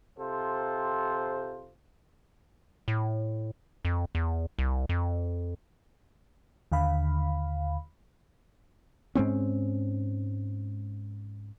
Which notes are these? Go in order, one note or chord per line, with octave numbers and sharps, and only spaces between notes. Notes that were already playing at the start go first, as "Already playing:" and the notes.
C3 F4 A4 C5
A2
F2
E2
C2
F2
D#2 D3 F5 B5
G#2 G#3 C4 C#4